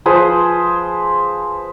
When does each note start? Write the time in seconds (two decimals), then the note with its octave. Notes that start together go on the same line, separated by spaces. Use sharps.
0.06 F3 G#4 B4 C5